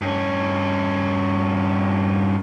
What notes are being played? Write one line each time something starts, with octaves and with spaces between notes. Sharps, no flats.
G2 C#4